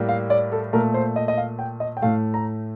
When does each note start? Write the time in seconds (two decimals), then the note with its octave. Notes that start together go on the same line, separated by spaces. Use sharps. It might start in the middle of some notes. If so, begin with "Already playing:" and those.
Already playing: A2 G3 A#3
0.09 F5
0.30 D5
0.52 A4
0.73 A#2 A3 A#4
0.94 C5
1.16 D#5
1.28 D#5
1.37 F5
1.59 G5
1.80 D#5
1.97 G5
2.02 A2 A3 F5
2.34 A#5